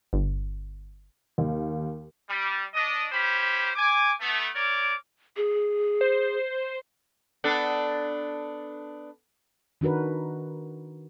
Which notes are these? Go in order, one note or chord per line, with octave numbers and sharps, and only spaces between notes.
G1
D#2
G3
D4 D#5
C#4 G4 C5 B5
G#5 D6
A3 B3
A#4 C#5 D5 D6
G#4
C5
B3 D4 A4
D#3 D4 F#4 A#4 B4